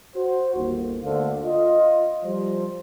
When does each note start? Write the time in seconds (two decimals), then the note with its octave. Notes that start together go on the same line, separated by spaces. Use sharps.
0.16 F#4 C5
0.55 G1 D#2
1.02 D2 D3 A3 A#3 C5 F5
1.44 F4 D#5
2.24 F3 G3 C5